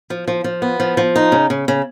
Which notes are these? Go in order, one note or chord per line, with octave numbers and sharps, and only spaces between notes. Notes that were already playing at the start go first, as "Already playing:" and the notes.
F3
F3
F3
B3
F3
F3
D#4
C#3
C#3
C#3